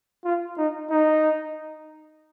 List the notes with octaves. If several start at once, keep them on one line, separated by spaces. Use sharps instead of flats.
F4
D#4
D#4